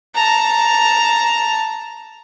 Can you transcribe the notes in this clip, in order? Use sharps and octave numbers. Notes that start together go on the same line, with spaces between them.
A5 A#5